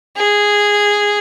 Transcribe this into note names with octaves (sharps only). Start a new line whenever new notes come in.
G#4